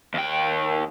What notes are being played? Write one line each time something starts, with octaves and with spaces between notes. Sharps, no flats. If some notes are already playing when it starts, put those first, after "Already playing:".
D#2 G5